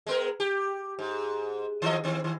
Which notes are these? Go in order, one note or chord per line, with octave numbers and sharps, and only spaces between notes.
G#3 B3 A#4
G4
G#2
D#3 F3 D#5
D#3 C4
D#3